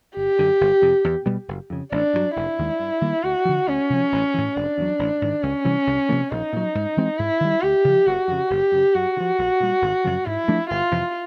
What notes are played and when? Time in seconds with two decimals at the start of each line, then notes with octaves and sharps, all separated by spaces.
0.17 G1 G4
0.39 F#2 D3
0.61 G1
0.82 F2 C3
1.04 E2
1.26 B2 G3 B3
1.48 F#1
1.70 F2 C#3
1.92 A1 D4
2.13 G2 D3 F#3
2.36 F1 E4
2.58 D#2 D#3 G#3
2.79 G2
3.01 D#3 G3 A#3
3.24 D2 F#4
3.45 D3 F3
3.67 D2 C#4
3.90 C3 F3
4.12 A1
4.34 A2 E3
4.55 F1 D4
4.78 E2 B2 F#3
4.99 A1
5.22 G#2 D#3
5.43 C#2 C#4
5.65 C3 E3 G3
5.87 C2
6.09 C3 F3 A#3
6.31 A#1 D#4
6.53 A#2 F#3
6.75 G#2
6.97 E3 G#3 C4
7.18 G#2 E4
7.40 D#3 G3
7.62 D2 G4
7.84 C#3 F3
8.06 F#1 F#4
8.28 F2 C#3
8.50 F#1 G4
8.72 F#2 C#3
8.94 F#2 F#4
9.17 D3
9.20 F3
9.38 A#1
9.60 A#2 G3
9.82 G#1
10.04 F#2 C#3 F3
10.25 G#2 E4
10.48 F3 A3 D4
10.70 G1 F4
10.91 F2 C3 E3